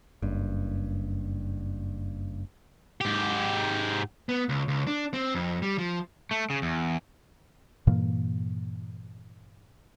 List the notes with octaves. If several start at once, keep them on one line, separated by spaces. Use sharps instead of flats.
F#1 G2
G#2 G4
B3
C#2
C#2
D4
C4
F2
G3
F3
A3
C#3
E2
G2 A#2 E3 A#3